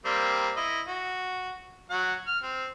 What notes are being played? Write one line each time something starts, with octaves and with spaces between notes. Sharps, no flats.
G3 A#3 C4
E4 D#5
F#4
F#3 F#5
F6
C4